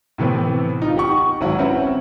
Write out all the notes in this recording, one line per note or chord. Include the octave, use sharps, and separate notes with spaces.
A2 C3 E3 B3 C4
D#4 F4
G4 F#5 C#6
G#1 F#3 E4 F#5
C4 C#4 B4 E5 F#5